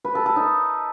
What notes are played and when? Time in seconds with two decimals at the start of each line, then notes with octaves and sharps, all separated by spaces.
0.04 B4
0.15 A4
0.26 A4
0.36 D#4